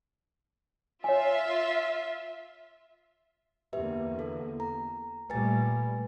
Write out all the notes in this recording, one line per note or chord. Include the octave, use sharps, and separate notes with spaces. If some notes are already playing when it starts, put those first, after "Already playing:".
F4 C#5 E5 G#5
E2 D3 A#3 G4 B4 E5
A4
A#5
A#2 G3 A3 B4 G#5 A6